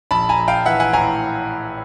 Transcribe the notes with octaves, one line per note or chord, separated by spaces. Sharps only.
A#1 A5 B5
G#5 A#5
A#1
F5 G5
E3 E5 F#5
F#5 G#5
A2 G#5 A#5